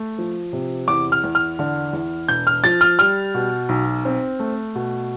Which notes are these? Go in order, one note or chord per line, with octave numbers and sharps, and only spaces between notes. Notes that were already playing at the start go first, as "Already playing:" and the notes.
Already playing: A3
F3
C3
E2 D6
F6
E2
F6
D3
E2
E1 G6
F6
F3 A6
F6
G3 F6
B2
B1
C4
A3
B2